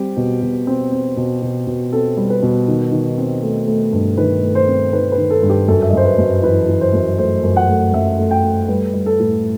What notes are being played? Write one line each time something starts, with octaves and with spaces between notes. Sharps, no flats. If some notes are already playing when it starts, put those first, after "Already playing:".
Already playing: G3 C4 G4
B2
B2
C4
C4
B2
B2
B2
C4 A4
G3
B4
B2
D#3
D#3
C4
A3
A3
G2
D#3 B4
A3
C5
C4
D#3 B4
B4
D#3
A4
G2
G4
F#2 A4
E5
D#5
F#2 C5
B4
F#2
E3 B4
E3
C5
F#2
A3 C5
F#2
F#5
A3
F#2 E5
A3
G5
A3
G3 B4
G3
A4
A2